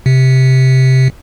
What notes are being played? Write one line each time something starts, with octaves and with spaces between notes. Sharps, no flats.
C3